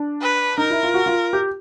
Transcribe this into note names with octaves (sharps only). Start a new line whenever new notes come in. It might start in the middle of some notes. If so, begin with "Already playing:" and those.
Already playing: D4
B4
D#4 A#4
E4
F4
F#4
F4
G4